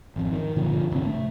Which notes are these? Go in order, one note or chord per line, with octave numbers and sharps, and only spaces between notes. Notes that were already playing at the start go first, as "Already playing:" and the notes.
G#1 F2
D#3
G1 A#2 D3 F3
D1 G#1 C3 D4
A3